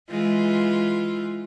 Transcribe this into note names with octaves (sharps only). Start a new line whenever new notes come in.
E3 G#3 F4